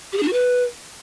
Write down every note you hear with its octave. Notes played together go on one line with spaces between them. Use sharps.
G4
G#4
D4
F#4
B4